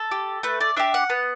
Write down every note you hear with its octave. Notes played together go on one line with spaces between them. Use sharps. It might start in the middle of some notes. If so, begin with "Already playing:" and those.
Already playing: A4
G4
A3 B4
D5
D4 G4 E5
F#5
B3